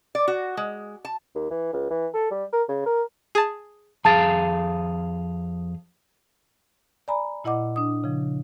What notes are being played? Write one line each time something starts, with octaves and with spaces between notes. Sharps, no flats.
D5
F#4
G#3
A5
D#2
E3
C#2
E3
A4
G3
A#4
C#3
A#4
G#4 A5
F2 G#4 F5 A5 A6
D5 G#5 A#5 B5
A#2 E4 D#5 F#5 D6
D4 D#6
C#3 F3